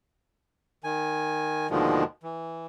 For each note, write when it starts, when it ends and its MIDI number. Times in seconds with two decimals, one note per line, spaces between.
0.84 1.67 51
0.84 1.67 80
1.70 2.04 39
1.70 2.04 47
1.70 2.04 50
1.70 2.04 51
1.70 2.04 53
1.70 2.04 56
2.23 2.67 52